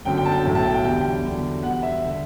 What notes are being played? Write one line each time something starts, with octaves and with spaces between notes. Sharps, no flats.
G1 F#2 D3 F#3 G5
G5
A5
G5
B1 A2 F#3 G5
A5
G5
G5
E2 D3 G3 G5
E2 D3 F#3
E2 B2 G3 F#5
E5
D3